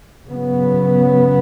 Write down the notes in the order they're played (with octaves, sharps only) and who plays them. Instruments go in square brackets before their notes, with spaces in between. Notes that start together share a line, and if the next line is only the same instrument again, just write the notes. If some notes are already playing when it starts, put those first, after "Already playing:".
[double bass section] C#3 F#3 B3